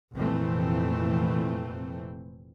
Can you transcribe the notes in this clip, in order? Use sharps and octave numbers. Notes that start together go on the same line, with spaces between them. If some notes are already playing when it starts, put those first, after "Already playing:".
F1 F2 A#2 E3 A3 C4